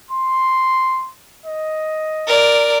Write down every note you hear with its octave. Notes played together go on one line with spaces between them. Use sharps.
C6
D#5
A#4 D5